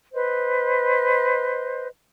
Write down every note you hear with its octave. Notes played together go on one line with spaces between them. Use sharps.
B4 C5 D#5